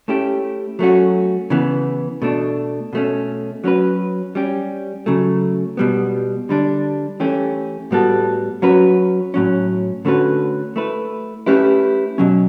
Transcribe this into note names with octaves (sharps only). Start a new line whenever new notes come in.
A3 C#4 E4 G4
F#3 A3 C#4 F#4
C#3 E3 B3
B2 A3 D4
B2 A3 C#4
F#3 C#4 F#4 B4
G3 C#4 G4
C#3 F#3 A3
B2 G3 B3
D3 G3 D4
E3 A3 C#4 G4
A2 G3 B3 F#4 A4
F#3 C#4 F#4 B4
A2 F#3 C#4
D3 A3 C#4 F#4 B4
A3 E4 B4
A3 C#4 E4 G4 B4
B2 F#3 C#4